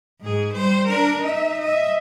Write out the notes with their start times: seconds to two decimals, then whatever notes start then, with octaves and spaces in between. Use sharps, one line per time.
0.21 G#2 G#4
0.53 G3 C5
0.87 D4 A#4
1.22 D#4 E5
1.61 D#5 E5